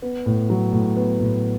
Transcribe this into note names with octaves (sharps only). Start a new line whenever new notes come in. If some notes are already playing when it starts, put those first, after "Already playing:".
B3
A2
F#3
A2
B3
A2